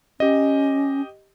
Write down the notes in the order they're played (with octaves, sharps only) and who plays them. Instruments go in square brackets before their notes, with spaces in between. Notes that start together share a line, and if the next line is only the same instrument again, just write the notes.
[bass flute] C#4 [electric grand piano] G4 D#5